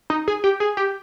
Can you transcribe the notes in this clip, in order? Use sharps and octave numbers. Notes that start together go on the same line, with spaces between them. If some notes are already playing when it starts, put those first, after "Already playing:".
D#4
G#4
G4
G#4
G4